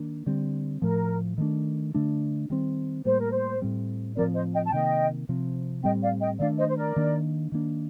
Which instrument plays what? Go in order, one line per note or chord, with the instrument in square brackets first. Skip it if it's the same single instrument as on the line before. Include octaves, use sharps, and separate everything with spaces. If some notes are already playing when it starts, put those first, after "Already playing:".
Already playing: [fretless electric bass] D#3 A#3 D4
D3 G3 C4
[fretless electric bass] A2 F3 A3 [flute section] A#4
[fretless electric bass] D#3 A3 D4
D3 A3 D4
D#3 G3 C4
[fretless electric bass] A2 G3 A#3 [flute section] C5
[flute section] A#4
C5
[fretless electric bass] A2 G3 C4
[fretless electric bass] A2 F3 C4 [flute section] A#4 D5
[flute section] C5 D#5
D#5 G5
A5
[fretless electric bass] C3 D#3 A#3 [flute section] D#5 G5
[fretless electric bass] C3 F3 C4
[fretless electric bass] A2 G3 C4 [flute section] D#5 G5
[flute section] D5 F5
D#5 G5
[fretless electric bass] D#3 A3 D4 [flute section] D5 F5
[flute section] C5 D#5
C5
A#4 D5
[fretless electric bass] D#3 A#3 D4
D#3 A#3 D4